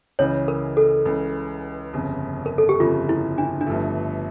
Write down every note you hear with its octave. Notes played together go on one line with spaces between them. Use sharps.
C#2 C#3 E3 C#5
A#4
A4
C#2 C#3 E3
G1 F2 C#3
A#4
A4
G4
G1 F2 C#3 F4
E4
D4
D4
G1 G2 F3 A3